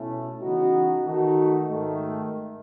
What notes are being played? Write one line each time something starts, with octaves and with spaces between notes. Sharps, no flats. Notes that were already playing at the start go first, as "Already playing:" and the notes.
Already playing: B2 A3 C#4 E4
C#3 E3 B3 D#4 F#4
D#3 A3 D#4 F#4
G#2 D#3 A3